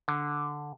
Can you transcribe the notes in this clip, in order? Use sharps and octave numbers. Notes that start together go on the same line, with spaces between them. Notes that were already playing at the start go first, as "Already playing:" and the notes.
D3